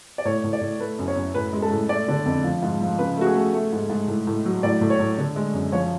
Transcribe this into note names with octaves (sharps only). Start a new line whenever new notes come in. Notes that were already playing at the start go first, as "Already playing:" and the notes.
D5
A2 C#5
A2
D5
A2
A3 B4
F#2
C#5
F#2
A2 B4
G#3
A4
A2
A3 D5
D3
F2
F3
G#2
F3
C#3 B4
A3 F#4
G#4
A3
A3
G#2
G#2
A2
A2
F#3
A2 D5
A2
C#5
A2
D3
G#3
F#2
F3 C#5